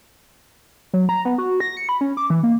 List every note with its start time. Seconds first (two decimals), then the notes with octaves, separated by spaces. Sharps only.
0.93 F#3
1.09 A#5
1.25 B3
1.38 F#4
1.60 A#6
1.77 C#7
1.89 B5
2.01 C#4
2.17 D6
2.30 E3
2.43 A#3